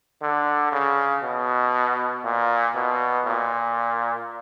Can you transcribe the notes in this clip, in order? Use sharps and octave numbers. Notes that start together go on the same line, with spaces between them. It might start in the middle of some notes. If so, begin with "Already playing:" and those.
D3
C#3
B2
A#2
B2
A#2